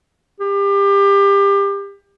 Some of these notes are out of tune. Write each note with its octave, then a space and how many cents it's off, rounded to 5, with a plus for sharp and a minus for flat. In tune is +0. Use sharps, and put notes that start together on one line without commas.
G4 +30